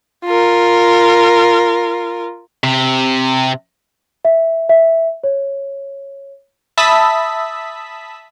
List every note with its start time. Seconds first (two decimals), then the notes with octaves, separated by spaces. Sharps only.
0.25 F4 A#4
2.64 C3
4.25 E5
4.69 E5
5.24 C#5
6.78 E5 A5 B5 D#6 E6 B6